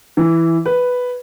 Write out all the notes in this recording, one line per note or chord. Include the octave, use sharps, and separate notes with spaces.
E3
B4